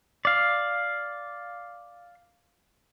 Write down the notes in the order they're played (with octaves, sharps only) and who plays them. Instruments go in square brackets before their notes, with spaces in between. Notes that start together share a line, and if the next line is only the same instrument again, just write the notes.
[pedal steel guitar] D5 F5